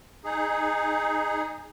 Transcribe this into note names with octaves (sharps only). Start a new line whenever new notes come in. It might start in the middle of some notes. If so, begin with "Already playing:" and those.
D#4 G#4